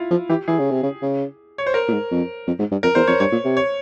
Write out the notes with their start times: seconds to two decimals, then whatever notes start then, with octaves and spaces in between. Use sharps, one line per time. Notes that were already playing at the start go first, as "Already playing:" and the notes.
Already playing: E4 F4
0.11 F3
0.29 E3 G4
0.48 E3 G#4
0.59 C#3
0.71 C3
0.83 C#3
1.02 C#3
1.58 C#5
1.67 C5
1.74 A#4
1.88 A#2
1.93 G#2
2.11 F2
2.47 F2
2.59 G#2
2.71 G2
2.83 F2 A#4
2.95 E2 C5
3.07 F2 C#5
3.20 G2 C#5
3.32 A#2
3.44 C3
3.57 C#5